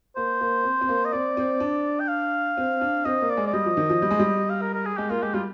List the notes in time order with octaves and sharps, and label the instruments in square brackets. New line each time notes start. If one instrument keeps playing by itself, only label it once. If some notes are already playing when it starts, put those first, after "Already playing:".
[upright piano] A#3 [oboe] C5
[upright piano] A#3
C4
C4
A#3
[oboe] D#5
[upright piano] C4 [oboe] D5
[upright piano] C4
D4
[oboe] G5
F5
[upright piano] C4
D4
[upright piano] C4 [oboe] D#5
[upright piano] A#3
[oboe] D5
[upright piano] G#3
[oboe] D5
[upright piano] G3 [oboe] D#5
[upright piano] F3
D#3
F3
G3
G#3
G3
[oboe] F5
A#4
A#4
G#4
[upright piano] G#3 [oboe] G4
[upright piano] A#3 [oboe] F4
[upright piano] G#3 [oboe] G4
[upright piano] G3 [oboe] F4